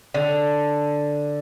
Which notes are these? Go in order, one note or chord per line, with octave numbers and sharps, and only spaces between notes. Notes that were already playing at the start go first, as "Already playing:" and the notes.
D3